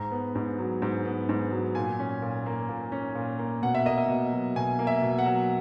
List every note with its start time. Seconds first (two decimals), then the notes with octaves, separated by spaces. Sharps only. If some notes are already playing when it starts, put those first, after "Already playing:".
Already playing: G#2 A#5
0.11 B3
0.35 G#2
0.58 F#3
0.82 G#2
1.05 B3
1.29 G#2
1.52 F#3
1.75 A#2 G#5
1.99 C#4
2.22 A#2
2.46 A#3
2.69 A#2
2.92 C#4
3.15 A#2
3.39 A#3
3.62 B2 F#5
3.75 E5
3.85 A#3 D#5
3.98 E5
4.09 B2
4.32 F#3
4.56 B2 G#5
4.79 A#3
4.87 E5
5.02 B2
5.19 F#5
5.26 F#3